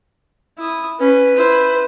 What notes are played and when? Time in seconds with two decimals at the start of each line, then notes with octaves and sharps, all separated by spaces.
0.58 E4 D#6
0.99 C#4 B4
1.36 E4 C5